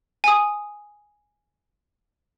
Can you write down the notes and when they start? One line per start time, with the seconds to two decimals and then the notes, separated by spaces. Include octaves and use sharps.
0.24 G#5 D#6